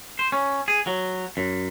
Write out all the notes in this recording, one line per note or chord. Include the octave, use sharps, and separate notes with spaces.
C5
C#4
G#4
F#3
F#2